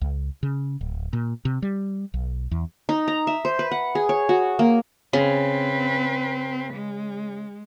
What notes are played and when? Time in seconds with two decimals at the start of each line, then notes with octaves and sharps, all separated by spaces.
0.01 C#2
0.43 C#3
0.81 D1
1.13 A#2
1.45 C3
1.62 G3
2.14 B1
2.51 E2
2.89 D#4
3.08 A#5
3.27 E5
3.45 C5
3.59 B4
3.71 F#5
3.95 G#4
4.09 C#5
4.29 F#4
4.59 A#3
5.13 C#3 C4 B4
6.74 G#3